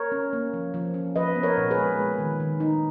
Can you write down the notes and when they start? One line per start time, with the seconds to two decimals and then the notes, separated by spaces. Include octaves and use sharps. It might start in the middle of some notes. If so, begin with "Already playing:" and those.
Already playing: A#4 C#5
0.12 C#4
0.33 A#3
0.53 F3
0.74 F3
0.94 C#4
1.16 F3 B4 D#5
1.36 B3
1.43 A#4 C#5
1.57 A#2
1.71 G#4 B4
1.78 G#3
1.99 G#3
2.19 D#3
2.40 D#3
2.60 D#4